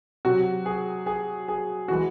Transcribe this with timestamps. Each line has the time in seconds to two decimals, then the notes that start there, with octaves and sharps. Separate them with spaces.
0.25 C3 F#3 F#4
0.66 G#4
1.06 G#4
1.48 G#4
1.88 E3 G#3 F#4